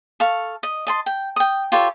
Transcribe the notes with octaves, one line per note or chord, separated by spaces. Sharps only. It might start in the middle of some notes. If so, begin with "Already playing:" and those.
A4 F5 C#6
D#5
D#5 A5 C6
G5
G5 D#6
F4 G4 A4 C#5